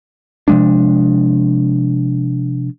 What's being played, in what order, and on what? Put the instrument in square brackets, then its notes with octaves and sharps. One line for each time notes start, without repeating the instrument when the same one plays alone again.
[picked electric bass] C3 F3 G#3 D4